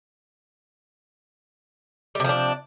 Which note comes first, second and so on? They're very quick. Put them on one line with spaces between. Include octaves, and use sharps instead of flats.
G3 C3 F3 D4